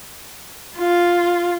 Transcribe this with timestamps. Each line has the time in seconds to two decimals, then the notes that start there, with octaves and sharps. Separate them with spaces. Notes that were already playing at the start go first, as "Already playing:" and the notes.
0.77 F4